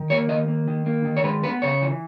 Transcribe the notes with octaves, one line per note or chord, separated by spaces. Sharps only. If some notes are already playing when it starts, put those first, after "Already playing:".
Already playing: D#3
A#3 C#5
D#3 D#5
A#3
D#3
A#3
D#3
C#5
G#3 B4
B3 B4
C#3 C#5
E3